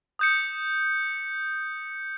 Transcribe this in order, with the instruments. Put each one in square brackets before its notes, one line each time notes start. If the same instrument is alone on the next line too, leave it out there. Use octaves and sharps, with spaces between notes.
[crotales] D#6 G6 C#7